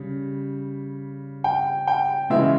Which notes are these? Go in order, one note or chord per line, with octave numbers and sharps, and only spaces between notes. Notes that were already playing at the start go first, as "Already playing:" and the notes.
Already playing: C#3 G3
G5
G5
C#3 E3 G#3 E5